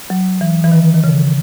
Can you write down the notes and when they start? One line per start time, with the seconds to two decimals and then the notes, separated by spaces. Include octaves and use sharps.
0.10 F#3
0.41 E3
0.64 E3
0.72 D#3
0.94 D#3
1.04 C#3